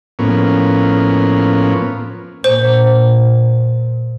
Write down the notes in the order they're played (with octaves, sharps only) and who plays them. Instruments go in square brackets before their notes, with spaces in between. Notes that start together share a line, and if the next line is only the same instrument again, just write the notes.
[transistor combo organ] A2 F3 A#3 B3 C#4
[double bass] A#2 [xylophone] C5